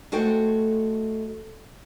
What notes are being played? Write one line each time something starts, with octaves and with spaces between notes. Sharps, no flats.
G#3 A3 F#4 A4 C5 G5